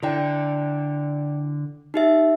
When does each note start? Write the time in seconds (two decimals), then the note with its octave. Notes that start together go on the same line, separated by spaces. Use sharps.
0.03 D3 E4 D5 G5
1.94 D#4 G4 E5